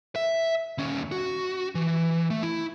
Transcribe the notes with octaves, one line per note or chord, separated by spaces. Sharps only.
E5
D#2 C#4
F#4
E3
A3
E4